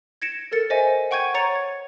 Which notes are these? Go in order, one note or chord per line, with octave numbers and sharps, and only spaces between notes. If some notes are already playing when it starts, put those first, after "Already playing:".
G#6 A#6 C#7 D7 E7
A4 A#4 A6 C#7
C5 D#5 E5 G#5
F#5 G5 C#6 G6 G#6 D#7
C#5 A#5 C#6 A6 C#7 F7
G#6